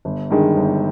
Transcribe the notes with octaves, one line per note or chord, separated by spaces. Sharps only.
G1
G2 D#3 G#3
G1